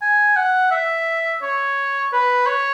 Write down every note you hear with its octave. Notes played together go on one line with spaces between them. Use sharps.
G#5
F#5
E5
C#5
B4
C#5